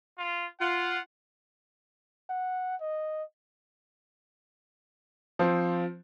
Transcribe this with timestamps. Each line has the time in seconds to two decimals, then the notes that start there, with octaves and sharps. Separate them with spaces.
0.19 F4
0.60 F4 F#5
2.30 F#5
2.81 D#5
5.39 F3 C4